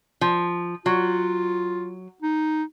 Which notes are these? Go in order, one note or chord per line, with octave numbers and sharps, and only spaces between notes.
F3
F#3 F4
D#4